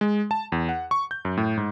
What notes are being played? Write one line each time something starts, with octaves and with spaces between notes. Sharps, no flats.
G#3
A5
E2
F#5
C#6
G6
F#2
A2
G#2